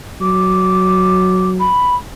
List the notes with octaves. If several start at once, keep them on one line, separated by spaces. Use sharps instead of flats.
F#3 D6
B5